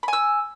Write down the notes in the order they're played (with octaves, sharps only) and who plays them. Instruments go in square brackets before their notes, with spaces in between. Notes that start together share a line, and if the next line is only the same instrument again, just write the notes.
[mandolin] B5
G#5
E6